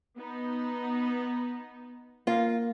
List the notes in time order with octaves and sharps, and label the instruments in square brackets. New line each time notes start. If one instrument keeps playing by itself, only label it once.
[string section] B3 D#4
[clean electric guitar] A#3 [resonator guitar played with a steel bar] F4